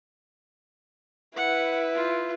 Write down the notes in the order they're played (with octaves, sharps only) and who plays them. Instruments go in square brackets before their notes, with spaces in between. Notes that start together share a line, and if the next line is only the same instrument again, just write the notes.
[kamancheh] E4 B4 [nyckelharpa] F#5
[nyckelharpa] F4